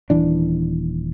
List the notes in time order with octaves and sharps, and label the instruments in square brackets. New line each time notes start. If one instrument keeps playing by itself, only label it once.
[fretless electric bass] D#1 E3 D4